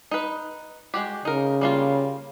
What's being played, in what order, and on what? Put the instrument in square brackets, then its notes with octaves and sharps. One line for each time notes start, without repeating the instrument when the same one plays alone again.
[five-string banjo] D#4 B4
G#3 F#4 G4
[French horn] C#3 [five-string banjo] D#4 A#4
[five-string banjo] G3 A#3 F4